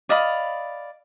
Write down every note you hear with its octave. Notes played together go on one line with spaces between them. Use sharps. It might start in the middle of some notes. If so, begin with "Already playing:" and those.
D5 D#5 F5 B5